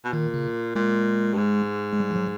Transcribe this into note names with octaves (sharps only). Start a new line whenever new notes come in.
B2
A#2 D#3
C#3
A#2 G#3
G2
G#2
G#3
G3
F3
F#3